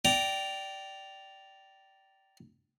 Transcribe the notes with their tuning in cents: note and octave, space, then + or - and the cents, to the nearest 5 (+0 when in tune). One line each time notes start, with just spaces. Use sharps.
D5 +0 G5 -20 A#5 +0